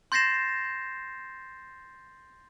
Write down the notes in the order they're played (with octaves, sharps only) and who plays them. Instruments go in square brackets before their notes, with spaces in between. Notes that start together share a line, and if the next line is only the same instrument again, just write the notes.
[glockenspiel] C6 G6 A6 A#6 C7 E7